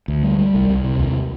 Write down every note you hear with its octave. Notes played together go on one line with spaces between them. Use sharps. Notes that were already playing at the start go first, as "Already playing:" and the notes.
D2
G3
G3
C2
C2
C3
D#2